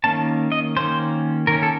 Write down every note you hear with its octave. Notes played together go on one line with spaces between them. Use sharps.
D#3 A#3 C#4 A5
D#5
D#3 A#3 C#4 C5
D#3 A#3 C#4 A#4
A4